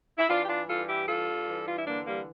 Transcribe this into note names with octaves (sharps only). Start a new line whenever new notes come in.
E4
E3 D4 F4
G4
D4 F4
G2 F4 A4
E4 G4
G2 F4 A4
E3
F4
E4
D3 A#3 D4
G3 A#3